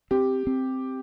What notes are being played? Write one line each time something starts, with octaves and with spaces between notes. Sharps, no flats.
C4 G4
C4